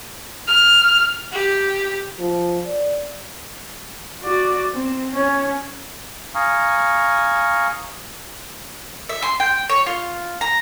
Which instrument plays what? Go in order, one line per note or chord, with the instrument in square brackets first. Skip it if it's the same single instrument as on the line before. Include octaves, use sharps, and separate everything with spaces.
[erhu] F6
G4
[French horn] F3
D5
[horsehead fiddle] F#4 D5
C4
C#4 C#5
[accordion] F5 G#5 A#5 C#6 D#6 F6
[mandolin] E5
C6
G5
C#5
F4
A#5